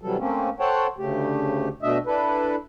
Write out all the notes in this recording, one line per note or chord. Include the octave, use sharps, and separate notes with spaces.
C3 E3 F#3 G3 A4
A3 A#3 C4 C#4
A4 C5 C#5 F#5 G5 A5
D2 C#3 A3 G4
B2 A3 D4 D#5 E5
D4 E4 A4 B4